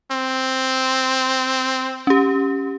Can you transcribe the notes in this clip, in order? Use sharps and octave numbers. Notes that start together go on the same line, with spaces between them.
C4
C#4 G4